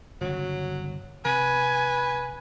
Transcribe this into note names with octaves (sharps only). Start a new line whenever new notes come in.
G1 C#3 F#3
C3 B4 G#5